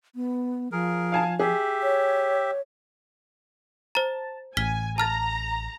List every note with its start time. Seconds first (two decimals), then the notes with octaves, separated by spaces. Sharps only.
0.15 B3
0.72 F3 G#4 A#4
1.12 F5 G#5 A5
1.39 G4 G#4 E5
1.83 C#5
3.95 C5 A5 A#5
4.57 A1 G#5 F6 B6 G7
4.98 A5 A#5 F6 A6